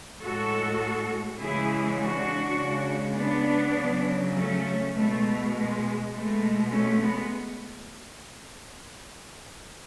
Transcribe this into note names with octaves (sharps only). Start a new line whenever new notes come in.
A2 G#3 F#4 A4
C#3 E3 G#3 E4 G#4
D4 F#4
C#3 G#3
B3 D4
C#3 F#3
A3 C#4
B2 G#3 A3
G#3
B2 G#3 A3
A3 C#4
G#3 B3